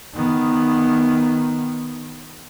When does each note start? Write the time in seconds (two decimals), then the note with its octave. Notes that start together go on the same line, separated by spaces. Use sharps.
0.14 D#3 B3